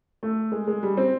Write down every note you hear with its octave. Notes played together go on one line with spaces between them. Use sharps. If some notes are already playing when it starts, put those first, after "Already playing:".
A3
G#3
G#3
G3
C4